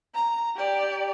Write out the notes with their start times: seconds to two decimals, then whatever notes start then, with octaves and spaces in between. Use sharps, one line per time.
0.14 A#5
0.56 G4 D5